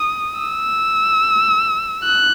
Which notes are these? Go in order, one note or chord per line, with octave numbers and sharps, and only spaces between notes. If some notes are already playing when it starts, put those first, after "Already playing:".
Already playing: D#6
E6
F#6